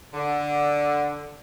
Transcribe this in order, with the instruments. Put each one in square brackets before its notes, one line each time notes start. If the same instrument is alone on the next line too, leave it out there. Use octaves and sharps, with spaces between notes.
[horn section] D3